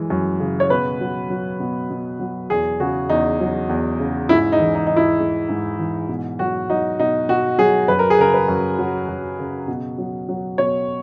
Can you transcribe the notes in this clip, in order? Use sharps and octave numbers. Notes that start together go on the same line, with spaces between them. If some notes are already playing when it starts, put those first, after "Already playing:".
Already playing: F#2 E3 G#3
F#2
C#3
C#5
B2 B4
F#3
F#3
B2
B2
F#3
E2 G#4
C#3 F#4
E2 D#4
F#3
E2
C#3
G#2 E4
D#4
E3
D#4
G#2 D#4
E4
G#3
G#2
E3
B2
F#3 F#4
F#3 D#4
B2 D#4
B2 F#4
F#3 G#4
F#2 B4
A#4
G#4
C#3 A#4
B4
F#2
F#3
F#2
C#3
B2
F#3
F#3
B2 C#5